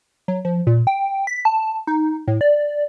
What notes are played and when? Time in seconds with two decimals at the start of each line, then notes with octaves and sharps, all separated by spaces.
0.28 F#3
0.45 F3
0.67 A#2
0.87 G5
1.27 B6
1.45 A5
1.87 D#4
2.28 A2
2.41 D5